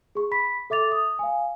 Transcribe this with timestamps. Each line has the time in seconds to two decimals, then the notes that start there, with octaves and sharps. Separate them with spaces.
0.15 G#4 C#6
0.31 B5 B6
0.70 A4 E5 D6 A6 F7
0.92 D#6
1.19 F5 G#5